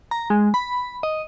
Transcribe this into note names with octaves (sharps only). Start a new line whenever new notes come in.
A#5
G#3
B5
D#5